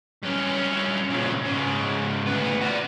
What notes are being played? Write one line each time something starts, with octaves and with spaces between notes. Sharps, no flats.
G2 C#4
A#2 C#3
G#2 C#3
D2 B3
F#4 D5